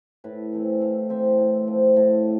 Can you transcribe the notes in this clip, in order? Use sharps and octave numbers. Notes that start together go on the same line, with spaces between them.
A2 B4
E3 A3 C4
A2 F5
E3 A3 C4 E5
A2
F3 C4
A2